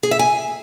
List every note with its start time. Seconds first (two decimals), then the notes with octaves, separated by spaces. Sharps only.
0.03 G#4
0.11 E5
0.19 G#5